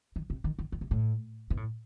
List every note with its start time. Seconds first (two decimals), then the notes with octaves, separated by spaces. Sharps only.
0.16 D#3
0.30 C3
0.44 D#3
0.59 D#3
0.72 D#3
0.81 C3
0.91 A2
1.50 B2
1.57 A2